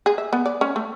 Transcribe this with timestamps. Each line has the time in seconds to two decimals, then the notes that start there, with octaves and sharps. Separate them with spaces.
0.06 G#4
0.18 E5
0.33 B3
0.46 D5
0.61 C#4
0.76 A3